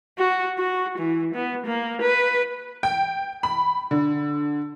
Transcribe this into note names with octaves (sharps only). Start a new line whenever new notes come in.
F#4
F#4
E3
B3
A#3
B4
G5
B5
D3